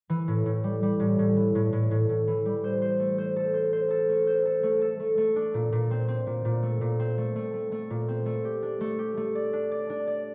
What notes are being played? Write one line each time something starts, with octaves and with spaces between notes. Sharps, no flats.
E3
A2
A2
G3
G3
A2
A2
E3
A2
A2
A2
A2
E3
G3
C5
C5
A3
C5
A4
C5
C5
A4
A3
C5
A4
A3
A4
A3
A3
D4
A#2
A#2
C4
C4
A#2
A#2
A3
A#2
C4
A3
A3
A3
A3
A#2
C4
A3
G4
D4
A3
G4
A3
D5
D4
D5
D4
D5